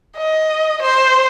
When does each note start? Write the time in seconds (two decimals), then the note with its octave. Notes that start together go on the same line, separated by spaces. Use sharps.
0.16 D#5
0.82 C5